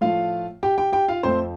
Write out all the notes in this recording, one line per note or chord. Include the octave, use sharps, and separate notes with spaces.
A2 F3 A3 F4 F5
G4 G5
G4 G5
G4 G5
F4 F5
F2 F3 A3 C4 C5